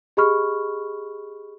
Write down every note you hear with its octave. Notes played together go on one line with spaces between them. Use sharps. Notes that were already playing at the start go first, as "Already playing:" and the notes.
G4 G#4 D#5 B5 C#6 F6